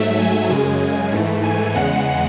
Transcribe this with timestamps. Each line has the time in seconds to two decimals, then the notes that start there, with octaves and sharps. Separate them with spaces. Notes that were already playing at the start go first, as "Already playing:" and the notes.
Already playing: G#2 F#3 A3 E5
0.19 G#5
0.49 F#2 C#3 G#3
1.12 G#2 E3 A3
1.43 G#5
1.75 E2 C#3 G#3 F#5